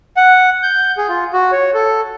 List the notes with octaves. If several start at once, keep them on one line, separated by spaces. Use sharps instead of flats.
F#5
G6
G#4
F4
F#4
C#5
A4